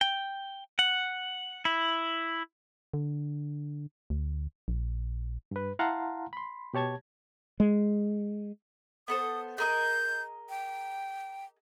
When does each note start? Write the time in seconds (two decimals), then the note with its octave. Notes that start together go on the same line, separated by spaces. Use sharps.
0.01 G5
0.79 F#5
1.65 E4
2.94 D3
4.10 D2
4.68 A#1
5.51 G2 B4
5.79 E4 F5 F#5 A5 A#5 C6
6.33 B5 C6
6.74 B2 G4 C#5 A5 G#6
7.60 G#3
9.08 B3 A4 C5 D#6
9.58 G#4 A#4 D#5 G6
10.49 G5